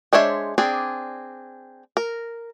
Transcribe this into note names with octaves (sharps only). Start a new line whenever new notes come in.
G#3 D4 C5 C#5 E5
C4 D4 G#4
A#4